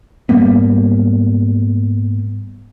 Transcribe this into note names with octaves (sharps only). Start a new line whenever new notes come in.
G#2 G3 A#3 B3